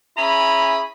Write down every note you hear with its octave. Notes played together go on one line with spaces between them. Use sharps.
C#4 E4 G#4 A#5 B5